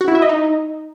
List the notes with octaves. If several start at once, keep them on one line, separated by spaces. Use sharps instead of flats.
F#4
E4
E5
D#5
D#4